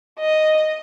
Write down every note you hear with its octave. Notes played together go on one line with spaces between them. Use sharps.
D#5